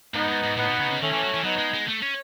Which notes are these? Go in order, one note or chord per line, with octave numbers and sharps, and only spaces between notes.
G#2 B3 D#4
G#2
G#2
A2 B3 D#4
B2
C#3
C#3
D#3 A3 C#4
E3
F#3
E3
F#3 B3 D#4
G#3
G#3
A3
C#4